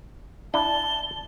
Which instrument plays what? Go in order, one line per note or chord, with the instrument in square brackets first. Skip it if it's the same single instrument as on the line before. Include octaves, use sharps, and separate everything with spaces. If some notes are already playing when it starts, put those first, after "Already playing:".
[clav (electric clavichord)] D4 E4 [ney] A5 [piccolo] G7